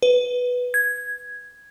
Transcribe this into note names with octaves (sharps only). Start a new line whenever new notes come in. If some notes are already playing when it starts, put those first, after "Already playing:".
B4
G#6